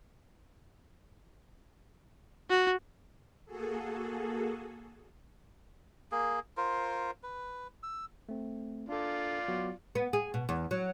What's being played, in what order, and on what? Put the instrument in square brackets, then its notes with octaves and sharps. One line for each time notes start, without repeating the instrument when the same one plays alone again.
[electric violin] F#4
[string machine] A#3 F#4 G#4 A4
[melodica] A#3 G#4
F4 A#4 C5
B4
E6
[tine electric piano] A3 C4
[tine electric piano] D4 A4 [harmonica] F4 D5
[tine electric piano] F#3 B3 F#4
[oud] B3
G#4
B2
E2
F#3